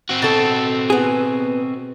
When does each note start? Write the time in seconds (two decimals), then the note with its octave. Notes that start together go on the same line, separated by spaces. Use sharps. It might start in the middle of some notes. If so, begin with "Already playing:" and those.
0.09 C4 F#4
0.22 B2 A4
0.90 B3 G#4